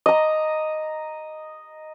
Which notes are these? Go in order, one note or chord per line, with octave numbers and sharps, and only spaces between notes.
D#5 A#5